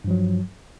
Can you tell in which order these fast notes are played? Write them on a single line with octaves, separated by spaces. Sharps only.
G2 F3 F#3